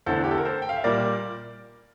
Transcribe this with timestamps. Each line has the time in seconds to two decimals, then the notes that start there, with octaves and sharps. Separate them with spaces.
0.06 E2 D3 A3 A4 C5
0.24 G4
0.31 A4
0.38 A#4
0.45 A4 C5
0.62 G5
0.69 F5
0.76 E5
0.84 A#2 G3 A#3 A#4 D5